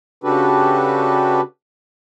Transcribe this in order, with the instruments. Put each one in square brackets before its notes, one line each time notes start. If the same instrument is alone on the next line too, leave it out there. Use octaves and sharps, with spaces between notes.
[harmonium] C#3 D4 F#4 G4 A4 B4